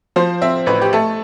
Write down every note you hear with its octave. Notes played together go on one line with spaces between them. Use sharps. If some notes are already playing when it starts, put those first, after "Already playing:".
F3 C5
C4 E5
A1 B4
G4
A3 A4